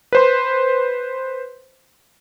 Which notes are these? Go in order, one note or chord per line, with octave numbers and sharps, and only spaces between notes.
B4 C5 C6